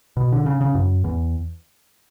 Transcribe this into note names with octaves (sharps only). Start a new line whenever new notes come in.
B2
D3
C#3
C#3
F#2
E2